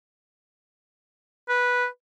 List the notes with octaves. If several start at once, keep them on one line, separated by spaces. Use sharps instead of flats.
B4